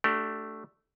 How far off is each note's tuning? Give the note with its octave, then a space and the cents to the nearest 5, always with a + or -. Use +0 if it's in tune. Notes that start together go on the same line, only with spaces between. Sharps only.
A3 +0 D4 +0 G4 -35